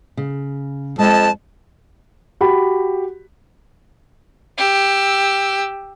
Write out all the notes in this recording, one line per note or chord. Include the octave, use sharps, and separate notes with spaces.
C#3
F2 G#3 D#5 A5
F#4 G4 B5
G4 E6